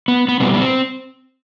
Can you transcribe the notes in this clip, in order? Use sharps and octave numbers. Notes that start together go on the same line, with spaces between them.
B3
B3
B2 G3 B3 C4
B3
C4